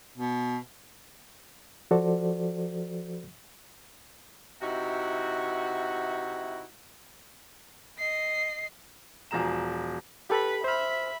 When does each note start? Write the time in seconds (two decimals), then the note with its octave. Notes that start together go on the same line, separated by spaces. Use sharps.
0.17 B2
1.91 F3 F#4 A4 C5 D5
4.61 C3 D#4 E4 F#4
7.98 D#5 C7
9.31 E1 F3 G#4 A#5 E7
10.30 G4 A4 B4 B5
10.64 C5 E5 B5 F6